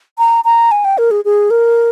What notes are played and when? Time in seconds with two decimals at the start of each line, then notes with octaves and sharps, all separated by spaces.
0.18 A#5
0.45 A#5
0.71 G#5
0.85 G5
0.98 A#4
1.11 G#4
1.25 G#4
1.50 A#4